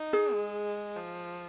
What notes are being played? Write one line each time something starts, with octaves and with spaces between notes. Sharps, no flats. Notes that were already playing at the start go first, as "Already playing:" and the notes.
Already playing: D#4
G#4
G#3
F3